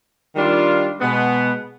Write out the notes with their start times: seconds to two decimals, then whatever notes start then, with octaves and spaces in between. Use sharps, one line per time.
0.36 D#3 G3 D4 F4
1.00 B2 G#3 B3